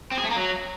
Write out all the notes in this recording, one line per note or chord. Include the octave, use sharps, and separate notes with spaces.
C4
G#4
A3
A#3
F#3